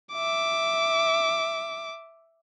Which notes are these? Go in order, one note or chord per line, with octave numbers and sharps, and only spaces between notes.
E5 D6